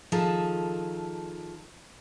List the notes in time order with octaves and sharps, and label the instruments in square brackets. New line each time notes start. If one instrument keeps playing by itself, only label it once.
[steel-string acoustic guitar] D#3 F3 G#4 A4 A5 A#5